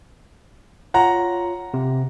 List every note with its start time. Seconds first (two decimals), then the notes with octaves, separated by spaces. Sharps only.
0.94 F4 C#5 F#5 A#5
1.74 C3